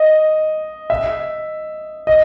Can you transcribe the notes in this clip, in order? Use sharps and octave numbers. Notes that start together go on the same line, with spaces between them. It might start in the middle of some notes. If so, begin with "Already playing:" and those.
Already playing: D#5
E5
D#5